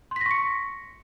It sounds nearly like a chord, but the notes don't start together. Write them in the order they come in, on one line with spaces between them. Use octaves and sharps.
C6 B6 A#6 C#6 C#7